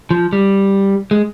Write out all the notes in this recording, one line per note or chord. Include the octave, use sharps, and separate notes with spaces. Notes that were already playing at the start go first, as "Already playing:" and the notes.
F3
G3
G#3